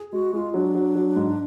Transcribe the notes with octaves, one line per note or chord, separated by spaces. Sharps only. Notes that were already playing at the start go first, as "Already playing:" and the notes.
Already playing: G#4
G#3 F#4
G#3 F4
F#3 D4
F#3
F#3
G#2